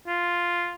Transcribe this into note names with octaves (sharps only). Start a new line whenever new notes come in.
F4